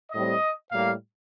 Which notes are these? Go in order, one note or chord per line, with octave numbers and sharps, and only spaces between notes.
A2 G3 C4 D#5
A2 G3 A#3 F5